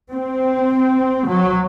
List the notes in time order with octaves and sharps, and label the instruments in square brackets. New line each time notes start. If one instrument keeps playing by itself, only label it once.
[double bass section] C4
F#3